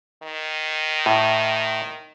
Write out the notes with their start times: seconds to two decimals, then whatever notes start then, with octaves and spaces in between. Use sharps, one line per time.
0.23 D#3
1.06 A2